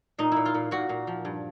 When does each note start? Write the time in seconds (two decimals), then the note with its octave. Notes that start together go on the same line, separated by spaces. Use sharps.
0.18 A#2 D#4
0.32 A#2 E4
0.45 F4
0.54 A#2
0.71 A#2 F#4
0.89 A#2
1.07 F3
1.25 G2